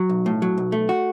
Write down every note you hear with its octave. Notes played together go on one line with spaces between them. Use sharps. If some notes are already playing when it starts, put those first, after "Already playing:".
Already playing: F#3
B1
A2
F#3
B1
A3
F#4